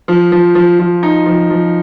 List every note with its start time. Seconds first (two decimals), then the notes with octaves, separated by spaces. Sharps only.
0.08 F3
0.32 F3
0.55 F3
0.79 F3
1.03 D#4
1.26 F3
1.50 F3